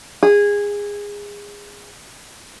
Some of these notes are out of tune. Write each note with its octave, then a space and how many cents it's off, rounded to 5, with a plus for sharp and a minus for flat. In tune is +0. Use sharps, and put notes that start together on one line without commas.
G#4 -20